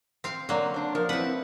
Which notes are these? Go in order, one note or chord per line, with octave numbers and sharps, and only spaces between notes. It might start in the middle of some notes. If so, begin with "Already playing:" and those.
C4 F5
D3 F#3 A#3
D4 C5
F3 A#4
C4 E4 B4 F#5